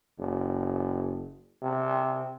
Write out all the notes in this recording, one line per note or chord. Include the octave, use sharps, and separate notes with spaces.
F#1
C3